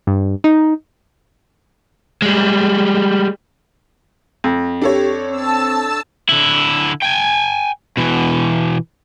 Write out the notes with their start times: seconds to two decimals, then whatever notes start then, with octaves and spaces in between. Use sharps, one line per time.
0.07 G2
0.44 D#4
2.22 G3 G#3
4.44 F2
4.82 D4 G4 A4 C#5
5.31 C4 A5 E6
6.29 D3 E4
7.02 G5 G#5
7.97 B2 E3